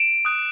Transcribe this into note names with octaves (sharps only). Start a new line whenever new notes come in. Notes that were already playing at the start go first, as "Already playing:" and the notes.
Already playing: D7 E7
D#6 F#6